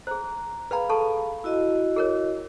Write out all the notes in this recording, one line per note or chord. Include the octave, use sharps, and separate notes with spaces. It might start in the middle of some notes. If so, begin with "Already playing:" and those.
G#4 C5 A#5
G#4 B4 F5 G5 A#5 B5
A4 A5 C#6
E4 F#4 D#5
G#4 A#4 C#5